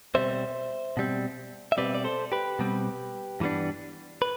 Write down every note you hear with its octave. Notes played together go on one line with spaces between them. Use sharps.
B2 G3 C4 C5 E5
B2 G3 C4
E5
B2 G3 C4 B4 D5
D5
A4 C5
G4 B4
B2 G3 C4
G2 E3 G3 B3 D4
B4